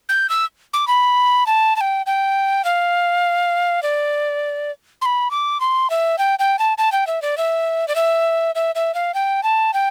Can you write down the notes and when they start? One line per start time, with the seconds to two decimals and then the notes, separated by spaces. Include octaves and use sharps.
0.09 G6
0.30 E6
0.73 D6
0.88 B5
1.46 A5
1.76 A5
1.81 G5
2.06 G5
2.65 F5
3.83 D5
5.02 C6
5.06 B5
5.31 D6
5.60 C6
5.90 E5
6.18 G5
6.39 G5
6.59 A5
6.78 A5
6.92 G5
7.07 E5
7.22 D5
7.38 E5
7.88 D5
7.96 E5
8.55 E5
8.75 E5
8.94 F5
9.14 G5
9.43 A5
9.74 G5